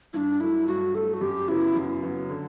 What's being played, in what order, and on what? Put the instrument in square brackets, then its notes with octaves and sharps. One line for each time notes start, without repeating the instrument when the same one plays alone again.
[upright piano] G2 [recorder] D4 E4
[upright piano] F#3 A3 [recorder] E4
[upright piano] G2 [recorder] F#4
[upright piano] F#3 A3 [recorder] A4
[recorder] F#4
[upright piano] F#2 [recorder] G4
[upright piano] C#3 F#3 B3 F#4 [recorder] E4
[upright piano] F#2
C#3 F#3 B3 F#4
D3